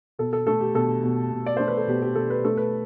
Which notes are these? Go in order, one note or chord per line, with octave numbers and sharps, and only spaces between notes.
B2 A4
A4
A3 A4
G4
B2 A4
B2
B2
D5
A3 C5
B4
A4
B2 G4
G4
B2 A4
B4
A3 A4
B4